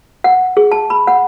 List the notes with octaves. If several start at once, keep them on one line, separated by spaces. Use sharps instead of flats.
F#5
G#4
A5
B5
F#5